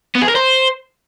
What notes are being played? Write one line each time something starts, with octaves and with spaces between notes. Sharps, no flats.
B3
G#4
A#4
C5